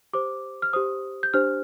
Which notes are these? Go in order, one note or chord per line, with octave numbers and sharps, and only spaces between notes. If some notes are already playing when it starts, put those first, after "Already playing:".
G4 C5 D6
F6
G4 C5 D#6
G6
D4 G4 C5 F6